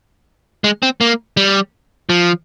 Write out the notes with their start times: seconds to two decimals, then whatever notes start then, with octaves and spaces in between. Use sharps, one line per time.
0.64 G#3
0.83 C4
1.01 A#3
1.37 G3
2.09 F3